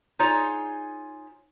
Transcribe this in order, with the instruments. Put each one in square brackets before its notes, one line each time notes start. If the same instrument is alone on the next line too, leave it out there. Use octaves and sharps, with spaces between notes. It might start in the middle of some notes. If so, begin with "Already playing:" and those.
[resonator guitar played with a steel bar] D#4 F4 G#4 C5 C#5